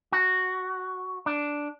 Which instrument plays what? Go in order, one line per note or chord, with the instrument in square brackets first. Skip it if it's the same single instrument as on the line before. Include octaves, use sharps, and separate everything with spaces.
[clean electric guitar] F#4
D4